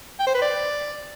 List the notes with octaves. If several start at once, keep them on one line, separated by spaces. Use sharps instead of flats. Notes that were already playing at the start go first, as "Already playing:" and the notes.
G5
C5
B4
D5